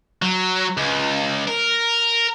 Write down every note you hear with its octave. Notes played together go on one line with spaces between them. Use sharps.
F#3
C#2
A#4